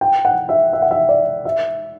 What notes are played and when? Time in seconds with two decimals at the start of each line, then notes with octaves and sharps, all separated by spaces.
0.01 G5
0.25 F#5
0.49 E5
0.73 E5
0.82 F#5
0.91 E5
1.09 D5
1.45 E5